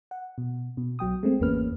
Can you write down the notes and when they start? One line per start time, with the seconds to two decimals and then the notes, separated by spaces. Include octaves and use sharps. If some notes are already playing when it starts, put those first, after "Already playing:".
0.11 F#5
0.38 B2
0.77 B2
0.99 B1 F#3 G5 D#6
1.23 G#3 A3 C4
1.40 G#1 E2 A#3 C#4 B4 F6